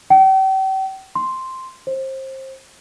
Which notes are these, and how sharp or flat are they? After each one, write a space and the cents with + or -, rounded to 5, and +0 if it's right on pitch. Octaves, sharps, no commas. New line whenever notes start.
G5 -40
C6 +0
C5 +25